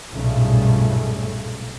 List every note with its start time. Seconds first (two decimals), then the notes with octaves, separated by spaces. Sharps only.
0.12 B1 G2 A#2 C#3 G3 A3